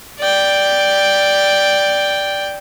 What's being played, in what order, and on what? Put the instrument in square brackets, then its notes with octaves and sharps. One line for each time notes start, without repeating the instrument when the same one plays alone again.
[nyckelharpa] D5 G5